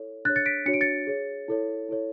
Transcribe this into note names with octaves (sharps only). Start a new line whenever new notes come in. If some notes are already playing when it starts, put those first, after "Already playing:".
Already playing: E4 A4 C#5
D4 G#4 C#5 F#6 A6
A6 C#7
B6 D7
D4 F#4 C#5 C#7
D7
A6 C#7
G#4 C#5
E4 A4 C#5
E4 A4 C#5